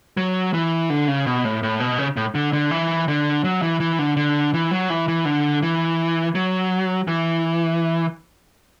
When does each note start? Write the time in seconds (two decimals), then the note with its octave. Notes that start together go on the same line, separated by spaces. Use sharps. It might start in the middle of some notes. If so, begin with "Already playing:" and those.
0.17 F#3
0.54 E3
0.90 D3
1.08 C#3
1.26 B2
1.45 A2
1.63 A2
1.80 B2
1.98 C#3
2.17 A2
2.35 D3
2.53 D3
2.71 E3
3.08 D3
3.44 F#3
3.62 E3
3.80 E3
3.99 D3
4.17 D3
4.54 E3
4.71 F#3
4.90 E3
5.08 E3
5.25 D3
5.62 E3
6.35 F#3
7.08 E3